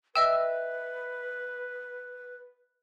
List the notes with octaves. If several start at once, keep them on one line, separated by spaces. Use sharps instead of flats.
B4 D#5 E5 G5 E6